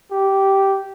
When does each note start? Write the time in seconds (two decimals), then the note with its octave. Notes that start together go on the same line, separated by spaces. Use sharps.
0.11 G4